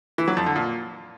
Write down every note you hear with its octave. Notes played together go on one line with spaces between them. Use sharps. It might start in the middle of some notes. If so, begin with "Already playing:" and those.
E3
F#3
F2
D3
A#2